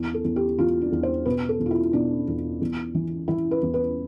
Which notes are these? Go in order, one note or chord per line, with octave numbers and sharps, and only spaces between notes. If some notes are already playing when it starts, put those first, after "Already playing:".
Already playing: E2
A4
E2
G4
E2 F4
D4
E2
C5
B2 B4
A4
E2
F4
E4
B2 D4
E2
E2
E3
E3 E4
B4
E2
B4